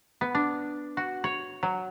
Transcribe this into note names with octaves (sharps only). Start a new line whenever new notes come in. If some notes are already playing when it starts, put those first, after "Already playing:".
B3
D4
F#4
C#5
F#3